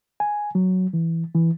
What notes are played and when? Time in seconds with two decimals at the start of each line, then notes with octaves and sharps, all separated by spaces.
0.20 G#5
0.55 F#3
0.93 E3
1.35 E3